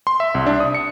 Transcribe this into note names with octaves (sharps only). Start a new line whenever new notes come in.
C6
E5
C2
D4
D#6
C#7